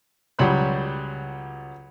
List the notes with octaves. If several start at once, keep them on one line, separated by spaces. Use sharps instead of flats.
C#2 F#3 G3 B5 C6 F#6